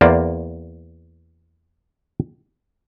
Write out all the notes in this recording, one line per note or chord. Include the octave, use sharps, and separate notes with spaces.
E2 A#3 C5 D5